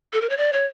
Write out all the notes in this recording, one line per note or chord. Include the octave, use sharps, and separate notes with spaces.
A4
A#4
C#5
D5
C#5